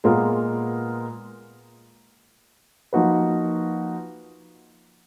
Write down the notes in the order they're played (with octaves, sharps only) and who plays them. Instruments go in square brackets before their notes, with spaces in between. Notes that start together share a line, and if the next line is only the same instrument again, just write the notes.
[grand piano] A#2 G#3 B3 F4 A#4
F3 A#3 D#4 F#4 B4